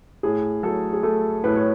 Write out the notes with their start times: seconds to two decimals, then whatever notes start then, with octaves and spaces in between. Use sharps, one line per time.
0.23 A2 G#4
0.63 F#3 A3 A4
0.93 G#4
1.03 A3 A4
1.44 A2 B4
1.56 C#5